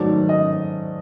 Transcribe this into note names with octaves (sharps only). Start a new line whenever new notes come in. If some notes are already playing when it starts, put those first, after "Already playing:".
Already playing: G#2 D#3 F#3 A3 D5
D#5